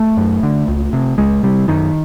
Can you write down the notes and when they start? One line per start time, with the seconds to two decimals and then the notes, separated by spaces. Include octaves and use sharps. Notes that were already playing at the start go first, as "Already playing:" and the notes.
Already playing: A3
0.17 F#2
0.43 D3
0.68 C#2
0.93 C3
1.18 C#2 G#3
1.43 C3 G3
1.68 F#2 D#3